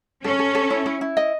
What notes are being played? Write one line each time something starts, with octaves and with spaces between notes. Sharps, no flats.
C#4 A4
A4
A4
E4
E4
E4
D#5